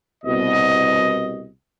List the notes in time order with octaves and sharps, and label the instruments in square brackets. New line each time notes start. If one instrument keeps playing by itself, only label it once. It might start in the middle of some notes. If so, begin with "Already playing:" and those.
[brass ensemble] C2 B2 D#5